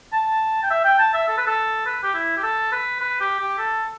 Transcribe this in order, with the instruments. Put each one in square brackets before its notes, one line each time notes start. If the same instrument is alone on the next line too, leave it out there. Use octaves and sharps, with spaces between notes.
[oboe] A5
G5
E5
G5
A5
E5
A4
B4
A4
B4
G4
E4
G4
A4
B4
B4
G4
G4
A4